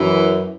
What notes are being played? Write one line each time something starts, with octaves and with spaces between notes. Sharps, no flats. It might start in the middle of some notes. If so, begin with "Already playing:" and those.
Already playing: F#2 E3